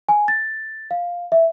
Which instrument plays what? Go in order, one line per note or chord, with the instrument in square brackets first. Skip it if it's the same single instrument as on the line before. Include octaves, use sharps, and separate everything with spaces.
[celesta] G#5
A6
F5
E5